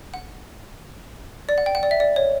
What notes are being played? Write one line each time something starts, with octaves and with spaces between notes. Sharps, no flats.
F#5
D5
F#5
G5
F#5
D5
E5
D5
C#5